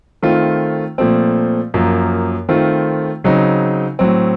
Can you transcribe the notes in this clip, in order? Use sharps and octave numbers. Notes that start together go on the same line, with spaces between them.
D#3 A3 C4 F4
A#2 F3 A3 C4
F#2 F3 A#3
D#3 A3 C4 F4
C#3 F#3 C4 D#4
A2 F#3 C4